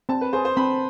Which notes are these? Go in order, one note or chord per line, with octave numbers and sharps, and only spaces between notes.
C4 A5
B4
G#4 C5
C5
C4 B5